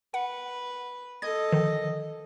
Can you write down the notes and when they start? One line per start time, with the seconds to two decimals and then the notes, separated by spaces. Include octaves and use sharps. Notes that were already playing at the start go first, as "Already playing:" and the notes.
0.14 B4 F#5
1.22 A4 D#5 G#6
1.52 D3 D#3 F3